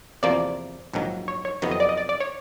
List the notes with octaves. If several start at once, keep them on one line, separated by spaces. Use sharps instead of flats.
E2 C3 F3 A#3 D5
A#1 G#2 D#3 F#3
C#5
C#5
F2 C3 D#3 F#3 B3
D#5
D5
D#5
D5
D5
C#5